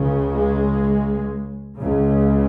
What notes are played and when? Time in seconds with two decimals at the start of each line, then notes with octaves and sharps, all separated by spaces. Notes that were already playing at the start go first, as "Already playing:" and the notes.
Already playing: C#2 C#3
0.35 G#3
1.78 C#2 C#3